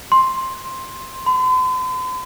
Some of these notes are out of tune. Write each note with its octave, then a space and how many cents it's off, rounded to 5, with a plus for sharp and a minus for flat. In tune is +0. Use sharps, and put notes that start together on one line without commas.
C6 +10
C6 -45